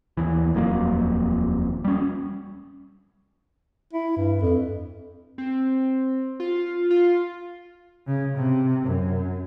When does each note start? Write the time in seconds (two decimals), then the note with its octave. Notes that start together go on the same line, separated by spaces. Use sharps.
0.17 D#2 E3
0.54 D#1 F2 F#3 A#3
1.84 G3 C#4
3.93 E4
4.16 G2
4.41 F2
5.38 C4
6.40 F4
6.91 F4
8.07 C#3
8.36 C3
8.86 F#2